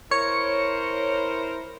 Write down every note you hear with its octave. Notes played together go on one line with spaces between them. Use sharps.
E4 A#4 C5 C#5 C#7